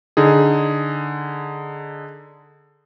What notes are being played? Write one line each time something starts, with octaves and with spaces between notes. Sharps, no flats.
D3 D#4 G#4